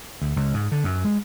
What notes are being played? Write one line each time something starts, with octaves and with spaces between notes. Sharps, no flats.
D2
C#2
G#2
D3
F#2
G#3